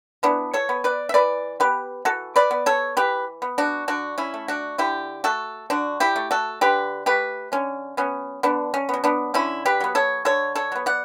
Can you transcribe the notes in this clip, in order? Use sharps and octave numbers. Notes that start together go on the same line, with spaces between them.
E3 B3 D4
A4 C#5
B3
B4 D5
E5
E3 B4 D5
B3 G4 B4
E3 F#4 A4
B4 D5
B3
A4 C#5
E3 G4 B4
B3
D4 F#4
D3 D4 F#4
C#4 E4
A3
D4 F#4
D3 E4 G4
A3 F#4 A4
D3 D4 F#4
E4 G4
A3
F#4 A4
D3 G4 B4
A3 G4 B4
D3 C#4
F#3 B3 C#4
D3 B3 D4
C#4
F#3 B3
B3 D4
D3 C#4 E4
G4 B4
F#3 B3
A4 C#5
D3 A4 C#5
A4 C#5
F#3 B3
D5 F#5